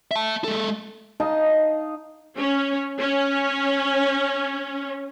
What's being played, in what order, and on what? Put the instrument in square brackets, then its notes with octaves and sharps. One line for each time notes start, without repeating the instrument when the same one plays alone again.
[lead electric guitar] E5 A5
G#3 A4
[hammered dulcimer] D#4 D#5 F5 A5
[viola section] C#4
C#4